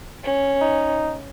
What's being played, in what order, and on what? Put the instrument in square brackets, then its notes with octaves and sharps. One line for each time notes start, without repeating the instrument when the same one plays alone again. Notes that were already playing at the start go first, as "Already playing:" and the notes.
[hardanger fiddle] C#4
[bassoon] D#4